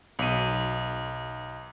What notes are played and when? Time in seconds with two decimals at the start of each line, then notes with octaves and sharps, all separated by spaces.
0.19 B1 D#7